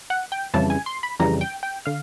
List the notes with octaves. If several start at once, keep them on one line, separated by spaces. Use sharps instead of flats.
F#5
G5
F2 C#3 E3 G3 A5
G#5
C6
B5
F2 C#3 E3 G3 A#5
G5
G5
D3 F5